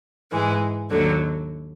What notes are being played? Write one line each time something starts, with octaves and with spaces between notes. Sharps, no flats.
G#2 E3 G#3
D#2 D3 F#3